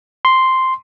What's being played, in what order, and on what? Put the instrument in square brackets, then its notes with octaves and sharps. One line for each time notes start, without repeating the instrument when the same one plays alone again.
[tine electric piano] C6